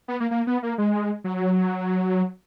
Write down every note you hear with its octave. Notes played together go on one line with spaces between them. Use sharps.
B3
A#3
A#3
B3
A#3
G#3
F#3